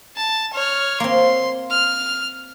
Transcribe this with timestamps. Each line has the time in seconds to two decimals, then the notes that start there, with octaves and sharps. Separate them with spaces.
0.17 A5
0.53 C#5 F6
1.00 A#3 C4 C6
1.71 F6